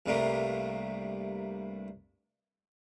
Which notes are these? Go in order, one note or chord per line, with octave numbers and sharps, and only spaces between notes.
C2 G2 C3 G3 A3 A#3